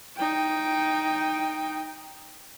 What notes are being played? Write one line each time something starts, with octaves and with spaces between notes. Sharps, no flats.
D#4 G5